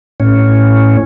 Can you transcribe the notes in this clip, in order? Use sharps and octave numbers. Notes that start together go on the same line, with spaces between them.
A2 C#4